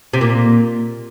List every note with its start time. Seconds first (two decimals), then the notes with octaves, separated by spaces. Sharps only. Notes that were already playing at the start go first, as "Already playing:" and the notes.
0.13 C3
0.21 A#2